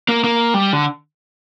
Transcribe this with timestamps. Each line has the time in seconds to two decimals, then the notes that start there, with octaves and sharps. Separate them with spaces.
0.08 A#3
0.24 A#3
0.54 G3
0.73 D3